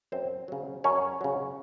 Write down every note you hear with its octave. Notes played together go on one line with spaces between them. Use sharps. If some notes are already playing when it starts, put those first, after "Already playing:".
F#2 C4 C5
C#3 F#3
F#2 C#4 C#5
C#3 F#3